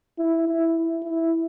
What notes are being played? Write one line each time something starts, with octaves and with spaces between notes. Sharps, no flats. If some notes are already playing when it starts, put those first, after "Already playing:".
E4
E4
E4